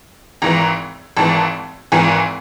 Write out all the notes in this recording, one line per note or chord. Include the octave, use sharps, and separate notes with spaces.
G#1 G#2 E3 A#5
G#1 G#2 E3 A5
G#1 G#2 E3 G#5